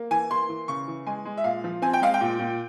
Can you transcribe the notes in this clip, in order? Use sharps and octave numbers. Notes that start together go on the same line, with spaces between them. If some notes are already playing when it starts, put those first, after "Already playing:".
Already playing: A#3
E3 G#5
A#3 C6
E3
C#3 C#6
E3
G#3 G#5
G#3
E5
A#2 F5
F3
C4 G#5
G5
G#3 F5
G5
A#2
A#2